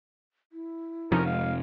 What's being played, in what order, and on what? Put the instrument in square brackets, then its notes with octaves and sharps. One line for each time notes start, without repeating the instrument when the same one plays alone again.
[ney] E4
[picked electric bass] F2 C3 [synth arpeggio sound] F3 C#4 D#4 [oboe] A#4
[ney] G#3 [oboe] F5